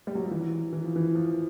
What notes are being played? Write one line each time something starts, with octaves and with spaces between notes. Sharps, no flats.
G3
F#3
F3
E3
E3
F3
E3
F3